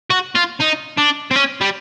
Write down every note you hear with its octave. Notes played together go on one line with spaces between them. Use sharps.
F#4
F4
D#4
D4
C4
C#4
G3